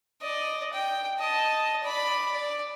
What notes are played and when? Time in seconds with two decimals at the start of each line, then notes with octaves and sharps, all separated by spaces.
0.21 D5 D#5
0.73 G5
1.19 D#5 A5
1.83 D5 B5
2.31 D5